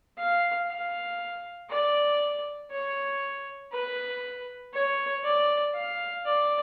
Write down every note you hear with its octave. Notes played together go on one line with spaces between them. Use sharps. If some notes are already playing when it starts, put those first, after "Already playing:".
F5
F5
D5
C#5
B4
C#5
D5
F5
D5